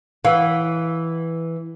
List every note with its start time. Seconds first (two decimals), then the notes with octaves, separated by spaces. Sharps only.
0.25 E3 F5 F#5